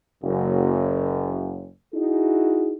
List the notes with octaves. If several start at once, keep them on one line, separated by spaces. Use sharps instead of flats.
F#1 F#2
D#4 E4 F#4 G#4